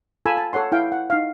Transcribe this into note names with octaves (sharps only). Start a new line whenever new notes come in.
F4 A4 G#5 B5 E6
A5
A4 C#5 F#5 C6
E4 F5 G5
F#5
D#4 F5